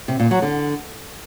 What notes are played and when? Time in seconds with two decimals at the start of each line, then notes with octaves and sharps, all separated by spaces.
0.08 C3
0.20 A#2
0.31 F#3
0.42 D3